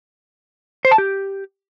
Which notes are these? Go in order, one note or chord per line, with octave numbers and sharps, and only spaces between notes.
C5
A5
G4